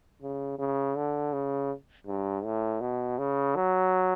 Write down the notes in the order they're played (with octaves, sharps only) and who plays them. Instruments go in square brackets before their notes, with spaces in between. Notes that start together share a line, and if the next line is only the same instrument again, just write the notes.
[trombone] C#3
C#3
D3
C#3
G2
A2
B2
C#3
F#3